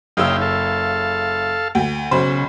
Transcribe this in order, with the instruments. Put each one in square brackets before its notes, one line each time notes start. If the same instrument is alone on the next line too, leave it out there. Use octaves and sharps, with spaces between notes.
[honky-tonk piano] F#1 C#3 E6 [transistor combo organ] D#4 F5 G5
[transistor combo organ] A4 F5
[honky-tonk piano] D2 G5
[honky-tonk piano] B1 C5 B5 [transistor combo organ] C#3